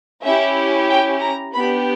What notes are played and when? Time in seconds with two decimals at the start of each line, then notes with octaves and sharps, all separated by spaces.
0.23 C#4 E4 G4 E5
0.89 G5
1.21 A#5
1.55 B3 D4 G4 B5